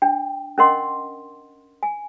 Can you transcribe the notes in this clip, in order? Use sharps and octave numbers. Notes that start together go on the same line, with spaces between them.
D4 G5
C#4 D4 A#4 D#5 F#5 C6
G#5